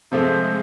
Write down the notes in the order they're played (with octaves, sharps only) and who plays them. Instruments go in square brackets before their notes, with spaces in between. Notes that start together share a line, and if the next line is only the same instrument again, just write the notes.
[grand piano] C3 F3 A3 C4 [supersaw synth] G#3